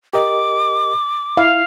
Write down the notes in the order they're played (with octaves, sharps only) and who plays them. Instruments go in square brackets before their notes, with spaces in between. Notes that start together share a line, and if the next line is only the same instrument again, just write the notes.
[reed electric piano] G4 A#4 D#5 [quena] D6
[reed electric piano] E4 [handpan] F5